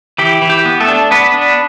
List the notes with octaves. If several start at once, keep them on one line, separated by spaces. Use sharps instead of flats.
E3 G4
E3
G4
B3
A3 A4
D4
B3 D4 B4
D4